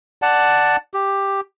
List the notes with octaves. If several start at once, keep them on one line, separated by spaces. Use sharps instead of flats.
D5 F#5 A5
G4